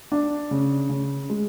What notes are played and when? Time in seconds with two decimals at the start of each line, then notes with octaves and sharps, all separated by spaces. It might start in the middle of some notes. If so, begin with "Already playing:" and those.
0.12 D4
0.51 C#3
0.89 C#3
1.30 G#3